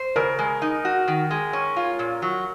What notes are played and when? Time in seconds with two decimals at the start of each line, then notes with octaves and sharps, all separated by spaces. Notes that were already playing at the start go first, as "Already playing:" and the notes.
Already playing: C5
0.16 C#3 A#4
0.39 G#3
0.62 D#4
0.85 F#4
1.08 D#3
1.31 G#3
1.53 C#4
1.76 F4
1.99 A#2
2.22 F#3